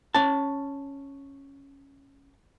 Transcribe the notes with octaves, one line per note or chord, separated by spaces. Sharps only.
C#4 A5